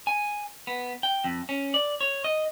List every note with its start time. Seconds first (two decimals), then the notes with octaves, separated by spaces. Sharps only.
0.07 G#5
0.67 B3
1.03 G5
1.24 F2
1.49 C#4
1.74 D5
2.01 C#5
2.24 D#5